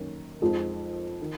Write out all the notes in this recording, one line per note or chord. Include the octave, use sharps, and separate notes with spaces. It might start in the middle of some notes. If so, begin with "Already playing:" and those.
Already playing: F#2 D#3 A#3 C#4
F2 F3 G#3 D#4
D#3